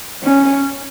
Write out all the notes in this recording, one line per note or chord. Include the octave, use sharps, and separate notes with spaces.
C#4